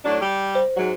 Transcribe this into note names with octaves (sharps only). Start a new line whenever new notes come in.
A2 F#3 D4
G3 G4
C5
G#2 F#3